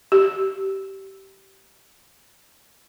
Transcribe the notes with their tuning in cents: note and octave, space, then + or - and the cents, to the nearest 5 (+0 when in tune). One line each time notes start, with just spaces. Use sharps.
G4 -20